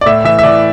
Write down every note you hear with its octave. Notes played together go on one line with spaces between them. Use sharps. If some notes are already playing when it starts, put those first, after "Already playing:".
D5
A2 E5
E3 E5
E5
E3 D5